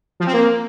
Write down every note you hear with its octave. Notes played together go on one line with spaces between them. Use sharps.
F3
C4
A#3